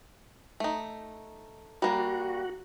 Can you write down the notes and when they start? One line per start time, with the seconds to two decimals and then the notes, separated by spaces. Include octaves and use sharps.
0.60 A3 D#4
1.82 G3 A#3 F#4